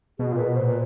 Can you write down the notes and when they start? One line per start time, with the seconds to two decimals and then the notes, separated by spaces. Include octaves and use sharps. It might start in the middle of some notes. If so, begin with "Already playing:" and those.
0.19 B2 G#4
0.32 A#2 B4
0.45 B2
0.55 A#2 C5
0.67 B4